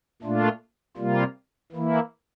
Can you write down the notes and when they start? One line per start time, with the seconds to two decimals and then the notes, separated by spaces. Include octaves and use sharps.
0.22 A#2 A3 D4 F4
0.97 C3 G3 A#3 F4
1.72 E3 A#3 E4